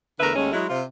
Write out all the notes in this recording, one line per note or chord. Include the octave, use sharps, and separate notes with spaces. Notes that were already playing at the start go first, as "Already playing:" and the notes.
E2 D3 A3 A#4 B4 E5
D#2 D#3 G#3 A3 C#4
F#3 G#3 E4
C3 F4